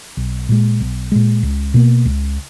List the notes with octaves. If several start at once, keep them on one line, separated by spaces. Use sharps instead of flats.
B1
A#2 G#3
B1
A#2 G#3
C#2
B2 A#3
C#2